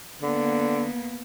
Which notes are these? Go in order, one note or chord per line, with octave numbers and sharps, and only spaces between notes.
D3 A#3 B3